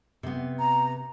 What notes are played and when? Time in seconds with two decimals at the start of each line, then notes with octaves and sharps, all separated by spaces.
0.23 C3 B3
0.59 A#5